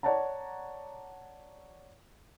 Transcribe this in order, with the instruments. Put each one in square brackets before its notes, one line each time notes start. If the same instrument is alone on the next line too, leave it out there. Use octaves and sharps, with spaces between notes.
[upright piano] C#5 D5 F#5 A5 A#5